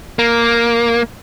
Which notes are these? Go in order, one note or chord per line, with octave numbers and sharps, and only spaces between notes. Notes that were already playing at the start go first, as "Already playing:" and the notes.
A#3